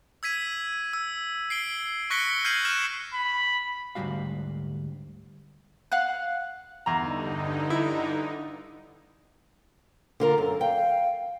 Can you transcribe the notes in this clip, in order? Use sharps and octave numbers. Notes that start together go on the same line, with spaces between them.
E6 G#6 B6 D#7
E6
C7 D7 G7
C#6 F#6 A#6 B6 C#7 G7
F6 G6 G#6 C7 D#7 F#7
F6 F#6 A#6 E7
B5
D2 G#2 C#3 G3 F#4 F5
F5 F#5 F#6
E2 G2 D3 D#4 A#5
E4
D3 F4 A#4
F#2 A4
F5 G5